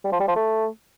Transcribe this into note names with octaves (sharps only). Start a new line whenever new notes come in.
G3
F3
G3
F3
A3